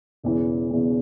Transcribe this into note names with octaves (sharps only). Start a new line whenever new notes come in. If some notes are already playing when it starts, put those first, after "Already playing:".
E1 E2 C#3 E3
E1 E2 C#3 E3